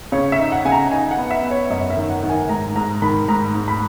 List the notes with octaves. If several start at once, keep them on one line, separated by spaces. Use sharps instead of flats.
C#3 C#5
E5
D#4
F#5
C#3 G#5
A#5
D#4 G#5
F#5
B3
E5
B3
C#5
F#2 D#5
E5
D#3
F#5
D#3
G#5
G#2 A#5
G#2 A#5
D#3 B5
G#2 A#5
G#2
B5